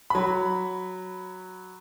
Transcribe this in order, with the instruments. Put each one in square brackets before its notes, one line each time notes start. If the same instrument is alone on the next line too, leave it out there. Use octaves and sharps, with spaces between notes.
[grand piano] F#3 B5